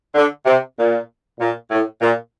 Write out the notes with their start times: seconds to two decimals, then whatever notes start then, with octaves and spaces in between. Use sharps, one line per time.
0.14 D3
0.46 C3
0.77 A#2
1.40 A#2
1.70 A2
2.01 A#2